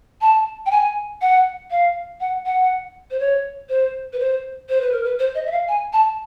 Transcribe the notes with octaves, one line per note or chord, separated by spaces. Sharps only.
A5
G5
G#5
F#5
F5
F#5
F#5
C5
C#5
C5
B4
C5
C5
B4
A#4
B4
C5
D#5
E5
F5
G#5
A5